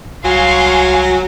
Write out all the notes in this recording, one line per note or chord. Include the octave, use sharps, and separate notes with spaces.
C2 F#3 F5 G#5 C6 C#6